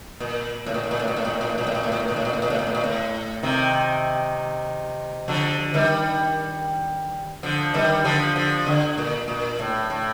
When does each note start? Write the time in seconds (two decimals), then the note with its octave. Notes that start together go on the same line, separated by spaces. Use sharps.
0.20 A#2
0.66 A2
0.74 A#2
0.83 A2
0.91 A#2
0.99 A2
1.08 A#2
1.16 A2
1.25 A#2
1.33 A2
1.41 A#2
1.49 A2
1.58 A#2
1.67 A2
1.75 A#2
1.83 A2
1.92 A#2
1.99 A2
2.08 A#2
2.16 A2
2.25 A#2
2.33 A2
2.42 A#2
2.50 A2
2.59 A#2
2.66 A2
2.75 A#2
2.84 A2
3.43 C3 D#3
5.28 D3 F3
5.74 D#3 G3
7.43 D3 F3
7.74 D#3 G3
8.04 D3 F3
8.36 D3 F3
8.66 D3
8.98 A#2
9.28 A#2
9.59 A2
9.90 A2